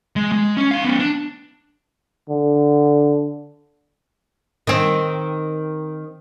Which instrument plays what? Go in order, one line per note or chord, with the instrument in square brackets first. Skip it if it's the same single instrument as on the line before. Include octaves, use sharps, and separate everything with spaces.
[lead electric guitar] G#3
G#3
C#4
D#4 F5
B3 C#4
D4
[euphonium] D3
[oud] D#3 C4